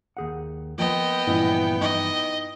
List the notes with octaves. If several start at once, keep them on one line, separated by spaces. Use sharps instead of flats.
D#2 G#4 F#5
F3 A#3 B3 D#5 G5
G2 A#2 E3 F3 C#4 E4
D#4 D#5